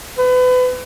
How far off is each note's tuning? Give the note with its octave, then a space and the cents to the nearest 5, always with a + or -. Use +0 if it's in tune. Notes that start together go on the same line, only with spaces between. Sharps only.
B4 +30